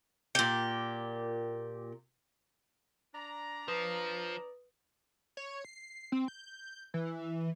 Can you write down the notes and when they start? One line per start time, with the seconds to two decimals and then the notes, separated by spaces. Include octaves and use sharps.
0.35 A#2 G4
3.14 D4 D5 A#5
3.68 F3 B4 D#6
5.37 C#5
5.65 C7
6.12 C4
6.28 G6
6.94 E3